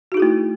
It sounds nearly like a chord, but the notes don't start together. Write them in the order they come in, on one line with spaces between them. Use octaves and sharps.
F#4 D#4 G#4 E4 A3